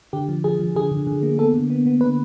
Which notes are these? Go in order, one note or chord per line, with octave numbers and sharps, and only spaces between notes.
D3 G4
F3
F3 G#4
F3
D3 G#4
D3
D3
A#3
B3 A4
D3
B3
B3
D3 B4